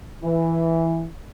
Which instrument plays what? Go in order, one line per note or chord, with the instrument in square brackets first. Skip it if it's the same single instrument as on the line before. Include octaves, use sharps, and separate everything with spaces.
[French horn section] E3